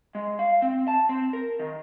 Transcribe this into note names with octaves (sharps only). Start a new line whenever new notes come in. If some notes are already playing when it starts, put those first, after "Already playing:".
G#3
F5
C4
A5
C4
A#4
D#3